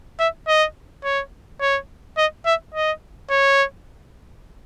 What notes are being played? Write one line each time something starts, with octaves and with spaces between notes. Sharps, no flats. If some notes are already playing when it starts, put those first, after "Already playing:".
E5
D#5
C#5
C#5
D#5
E5
D#5
C#5